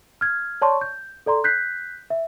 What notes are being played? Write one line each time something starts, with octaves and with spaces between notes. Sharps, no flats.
F6 G#6
C#5 D5 A5 C6 C#6
G6
A4 D5 A#5 C6
F#6 G6 B6 C7
E5